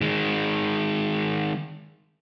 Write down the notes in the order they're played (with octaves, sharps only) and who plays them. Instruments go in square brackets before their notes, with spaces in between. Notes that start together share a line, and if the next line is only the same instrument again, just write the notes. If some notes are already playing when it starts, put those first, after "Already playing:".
[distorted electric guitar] D#3 G#3